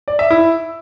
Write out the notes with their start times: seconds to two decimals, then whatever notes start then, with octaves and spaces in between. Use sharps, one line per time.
0.08 D5
0.19 E5
0.31 E4